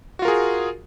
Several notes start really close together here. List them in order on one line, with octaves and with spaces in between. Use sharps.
F#4 F4 A#4 G#4